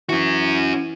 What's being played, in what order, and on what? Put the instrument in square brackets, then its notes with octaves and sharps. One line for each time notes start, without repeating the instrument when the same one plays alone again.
[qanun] E3 [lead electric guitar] C#4 F#4